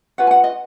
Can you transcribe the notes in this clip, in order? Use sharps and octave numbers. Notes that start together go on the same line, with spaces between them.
C#4 F4 B4 F#5
G#5
F#5
D#5